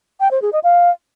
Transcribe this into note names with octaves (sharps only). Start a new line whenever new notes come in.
G5
C5
G#4
D#5
F5